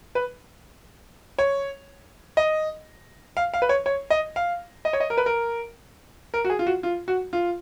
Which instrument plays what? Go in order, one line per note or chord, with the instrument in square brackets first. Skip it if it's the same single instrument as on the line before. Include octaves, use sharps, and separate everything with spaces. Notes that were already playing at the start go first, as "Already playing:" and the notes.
[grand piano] B4
C#5
D#5
F5
F5
B4
C#5
C#5
D#5
F5
D#5
C#5
D#5
A#4
B4
A#4
A#4
F#4
G#4
F4
F#4
F4
F#4
F4